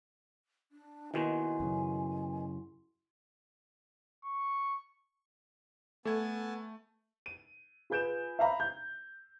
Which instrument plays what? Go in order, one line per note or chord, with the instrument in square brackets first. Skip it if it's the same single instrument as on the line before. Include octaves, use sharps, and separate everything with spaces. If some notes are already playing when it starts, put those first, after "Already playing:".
[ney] D4
[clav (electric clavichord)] D#2 B2 D#3 [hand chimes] E4 F#4 C6 [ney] G#5
[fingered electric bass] F#2 C#3
[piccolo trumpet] C#6
[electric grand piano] A3 [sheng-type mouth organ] B3 G#5 A5 [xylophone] A4 G#6
[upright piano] D#7
F4 G#4 B4 G6 D7 E7
E5 F5 A#5 B5
G6